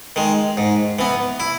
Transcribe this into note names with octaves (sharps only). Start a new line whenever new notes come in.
D#3 G#3
G#2
E3 B3
E4